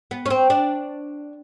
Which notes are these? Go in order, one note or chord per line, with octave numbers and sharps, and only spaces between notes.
B3
C#4
C4
D4